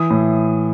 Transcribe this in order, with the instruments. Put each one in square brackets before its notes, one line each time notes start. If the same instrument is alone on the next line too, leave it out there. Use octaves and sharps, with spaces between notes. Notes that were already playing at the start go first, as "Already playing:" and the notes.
Already playing: [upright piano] E3 D#6
A2